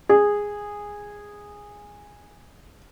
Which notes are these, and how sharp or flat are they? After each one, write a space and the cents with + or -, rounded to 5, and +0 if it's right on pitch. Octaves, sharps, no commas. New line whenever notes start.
G#4 -10